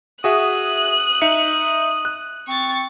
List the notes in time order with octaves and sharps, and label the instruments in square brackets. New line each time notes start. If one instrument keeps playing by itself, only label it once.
[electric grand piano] F#4 G#4 E5 [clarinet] D#6 [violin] F#6
[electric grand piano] D#4 E5 C#7
F#6
[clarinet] C4 [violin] C#6 A6